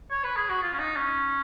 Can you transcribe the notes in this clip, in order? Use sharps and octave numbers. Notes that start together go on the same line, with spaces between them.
C#5
B4
G#4
F#4
F4
C#4
D#4
C#4